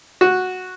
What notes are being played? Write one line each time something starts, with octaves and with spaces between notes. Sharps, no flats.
F#4